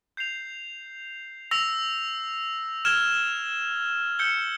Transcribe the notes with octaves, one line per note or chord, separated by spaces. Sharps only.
G6 C7 F7
E6 A#6 F7
F6 G#6 E7 G7
E6 G6 C#7 G7